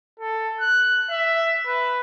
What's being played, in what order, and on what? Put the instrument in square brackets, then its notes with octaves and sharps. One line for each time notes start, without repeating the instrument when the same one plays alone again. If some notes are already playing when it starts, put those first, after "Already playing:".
[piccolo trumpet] A4
F#6
E5
B4